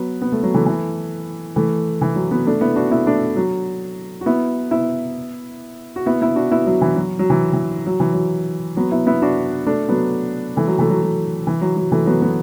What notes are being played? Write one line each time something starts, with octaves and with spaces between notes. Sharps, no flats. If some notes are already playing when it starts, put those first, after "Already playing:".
Already playing: F#3 B3
B3
A3
F#3
E3 A3
E3 A3
E3 A3
E3
F#3
F#3 B3
A3 D4
B3 E4
D4 F#4
B3 E4
A3 D4
F#3
F#4
B3 E4
B3 E4
F#4
B3 E4
B3 E4
D4 F#4
B3 E4
F#3
E3
F#3
F#3
E3
E3
F#3
E3
F#3
F#3 B3
B3 E4
B3 E4
D4 F#4
A3 D4
F#3 B3
E3 A3
F#3
E3 A3
F#3
F#3
E3
F#3
F#3
E3 A3
F#3 B3
F#3 B3